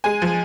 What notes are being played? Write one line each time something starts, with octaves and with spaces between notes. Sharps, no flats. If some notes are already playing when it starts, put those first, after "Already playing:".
G#3 G#5
F3